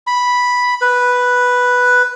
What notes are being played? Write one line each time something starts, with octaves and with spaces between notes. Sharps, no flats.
B5
B4